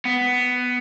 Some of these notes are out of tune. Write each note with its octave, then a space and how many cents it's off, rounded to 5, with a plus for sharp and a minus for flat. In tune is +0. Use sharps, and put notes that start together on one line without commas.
B3 +10